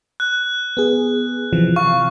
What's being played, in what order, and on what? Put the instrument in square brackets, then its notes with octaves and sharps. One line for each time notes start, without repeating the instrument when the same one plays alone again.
[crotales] F#6
[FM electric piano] B3 G#4
C3 E3 F3
[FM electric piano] F5 [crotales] C#6